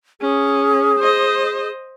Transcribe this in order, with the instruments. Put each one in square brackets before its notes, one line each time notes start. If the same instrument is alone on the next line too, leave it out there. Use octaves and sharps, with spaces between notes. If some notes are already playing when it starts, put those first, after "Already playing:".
[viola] C#4 [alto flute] G#4
[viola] C5 D#5